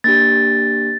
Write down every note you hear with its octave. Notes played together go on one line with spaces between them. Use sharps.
A#3 D4 G4 A6